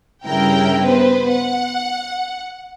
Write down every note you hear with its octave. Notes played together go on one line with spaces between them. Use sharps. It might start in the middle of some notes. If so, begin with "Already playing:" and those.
G2 C#3 E4 A#4 G5
B3 B4 C5
F#5